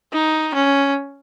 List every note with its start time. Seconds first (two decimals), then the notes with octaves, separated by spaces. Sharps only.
0.13 D#4
0.54 C#4